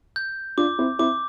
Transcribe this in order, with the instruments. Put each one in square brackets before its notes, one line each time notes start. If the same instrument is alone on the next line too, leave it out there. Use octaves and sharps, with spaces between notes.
[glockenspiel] G6
[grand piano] D4 F4 [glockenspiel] D6
[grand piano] C4 E4
[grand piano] C4 E4 [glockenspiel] D6